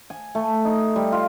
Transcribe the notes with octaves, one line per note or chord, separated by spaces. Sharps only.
G#5
A3
D#4
G3
F4